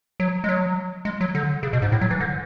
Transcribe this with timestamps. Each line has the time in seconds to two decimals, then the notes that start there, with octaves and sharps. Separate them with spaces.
0.20 F#3
0.44 G#3
0.49 F#3
1.05 G#3
1.21 F#3
1.35 D3
1.63 C#3
1.73 B2
1.82 G#2
1.92 A2
2.01 F#3
2.11 E3
2.21 D3